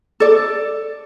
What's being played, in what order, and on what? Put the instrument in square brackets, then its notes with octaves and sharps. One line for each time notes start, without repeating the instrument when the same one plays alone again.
[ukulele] A4 D5